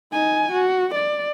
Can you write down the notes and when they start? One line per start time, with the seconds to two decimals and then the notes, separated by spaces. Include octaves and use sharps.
0.12 D#4 G#5
0.52 F#4
0.94 D5